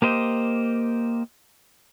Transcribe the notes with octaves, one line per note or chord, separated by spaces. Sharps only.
A#3 G4 C5 D#5